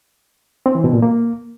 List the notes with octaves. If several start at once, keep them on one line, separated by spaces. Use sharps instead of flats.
C4
E3
B2
A#2
A#3